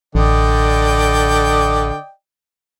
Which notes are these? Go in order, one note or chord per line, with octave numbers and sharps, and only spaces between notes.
A1 D3 D5 D#5 G5